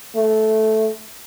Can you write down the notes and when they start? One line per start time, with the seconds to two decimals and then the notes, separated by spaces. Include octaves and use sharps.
0.16 A3